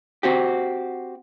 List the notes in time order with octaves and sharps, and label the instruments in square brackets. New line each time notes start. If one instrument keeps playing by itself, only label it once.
[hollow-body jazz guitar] C4 F#4 G4